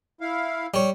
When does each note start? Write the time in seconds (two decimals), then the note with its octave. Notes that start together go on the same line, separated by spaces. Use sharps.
0.21 E4 F5
0.74 G3 C#5